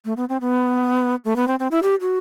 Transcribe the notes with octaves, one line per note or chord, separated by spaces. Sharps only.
A3
B3
C4
B3
A3
B3
C4
C4
E4
G4
F#4